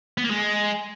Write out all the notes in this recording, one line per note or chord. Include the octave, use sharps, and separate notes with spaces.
B3
A#3
G#3